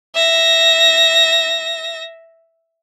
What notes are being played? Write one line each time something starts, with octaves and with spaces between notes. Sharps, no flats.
E5 A#6